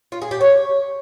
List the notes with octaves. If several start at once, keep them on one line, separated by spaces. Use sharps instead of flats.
F4
G#4
G4
C#5